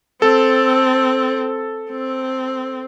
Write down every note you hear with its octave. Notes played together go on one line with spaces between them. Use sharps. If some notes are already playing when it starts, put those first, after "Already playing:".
C4 A4
C4